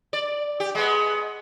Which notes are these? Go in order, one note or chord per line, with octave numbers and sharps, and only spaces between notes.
D5
G4
G#3 B3